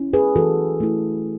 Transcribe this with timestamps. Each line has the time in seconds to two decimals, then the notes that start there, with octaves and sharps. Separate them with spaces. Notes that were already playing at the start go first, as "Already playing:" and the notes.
Already playing: C#4 E4
0.13 G#4 B4
0.36 E3 F#4 A4
0.80 A3 E4